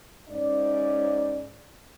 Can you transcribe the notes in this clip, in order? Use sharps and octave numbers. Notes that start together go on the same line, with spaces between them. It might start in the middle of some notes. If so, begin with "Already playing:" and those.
G#2 C#4 D5